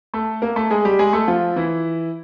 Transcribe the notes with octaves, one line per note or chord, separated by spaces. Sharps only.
A3 A4
A#3 A#4
A3 A4
G#3 G#4
G3 G4
G#3 G#4
A3 A4
F3 F4
E3 E4